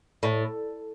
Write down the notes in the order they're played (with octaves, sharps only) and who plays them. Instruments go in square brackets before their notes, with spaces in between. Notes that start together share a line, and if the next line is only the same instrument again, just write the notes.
[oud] A2